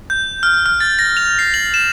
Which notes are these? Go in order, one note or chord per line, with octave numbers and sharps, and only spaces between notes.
G6
F6
F6
A6
A#6
F7
C7
F#7
E7